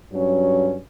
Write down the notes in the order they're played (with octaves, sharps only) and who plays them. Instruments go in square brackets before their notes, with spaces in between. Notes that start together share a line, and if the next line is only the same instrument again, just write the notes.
[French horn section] G2 F#3 C#4